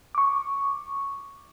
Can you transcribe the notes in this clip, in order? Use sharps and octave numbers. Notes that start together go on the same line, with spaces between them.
C#6 D6